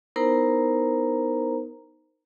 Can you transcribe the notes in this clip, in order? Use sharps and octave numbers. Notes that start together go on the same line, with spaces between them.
B3 D#4 E4 A#4 C5 A#5